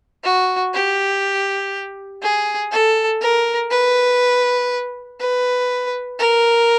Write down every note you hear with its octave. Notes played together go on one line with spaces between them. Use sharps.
F#4
G4
G#4
A4
A#4
B4
B4
A#4